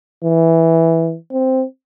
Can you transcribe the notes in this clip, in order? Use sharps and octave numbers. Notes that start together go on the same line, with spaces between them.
E3
C4